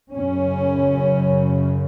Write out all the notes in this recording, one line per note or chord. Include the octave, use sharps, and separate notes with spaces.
F#2 C#3 C#4